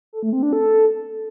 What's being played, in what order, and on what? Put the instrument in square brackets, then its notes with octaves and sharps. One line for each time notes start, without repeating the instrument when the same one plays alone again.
[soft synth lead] A4
A3
C4
D4
A4